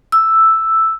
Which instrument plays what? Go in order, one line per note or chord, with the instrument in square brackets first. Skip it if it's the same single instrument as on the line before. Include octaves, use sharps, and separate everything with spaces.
[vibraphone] E6